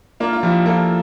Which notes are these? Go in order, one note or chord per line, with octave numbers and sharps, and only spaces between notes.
A#3 D4 F4
F4
F3 E4 G4
A#3 F4 A4